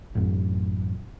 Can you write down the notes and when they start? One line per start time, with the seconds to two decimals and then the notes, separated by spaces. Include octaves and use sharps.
0.15 A1 F#2